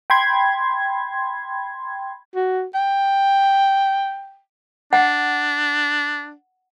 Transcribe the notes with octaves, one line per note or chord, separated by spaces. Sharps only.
G5 B5 C6 G#6
F#4
G5
D4 F#5